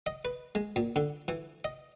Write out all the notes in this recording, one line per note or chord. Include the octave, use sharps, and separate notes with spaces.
D#5
B4
G#3
A#2
D3
E3
D#5